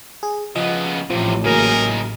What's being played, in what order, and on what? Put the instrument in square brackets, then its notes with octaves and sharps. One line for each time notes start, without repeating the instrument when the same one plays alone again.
[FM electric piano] G#4
[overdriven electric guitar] C#3 B3 [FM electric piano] F3 D#5
[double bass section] A1 [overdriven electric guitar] A2 C3 [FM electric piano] F3
[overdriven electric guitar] C#3 D#4 [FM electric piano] F#3 A#3 [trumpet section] G#4 A#4